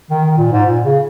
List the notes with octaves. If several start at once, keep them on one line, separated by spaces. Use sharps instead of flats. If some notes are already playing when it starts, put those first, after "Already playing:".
D#3
D#3
A#2
G#2
A#2
C#3